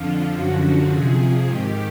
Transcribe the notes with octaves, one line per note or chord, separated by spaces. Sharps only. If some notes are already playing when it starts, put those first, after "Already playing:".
Already playing: F2 D3 F3 F4
F#2 D3 F3 F#4
F2 C3 F3 G#4
G#2 D#3 G4